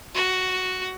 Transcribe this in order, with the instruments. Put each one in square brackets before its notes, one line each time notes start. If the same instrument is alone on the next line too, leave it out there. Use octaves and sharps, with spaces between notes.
[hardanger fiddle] F#4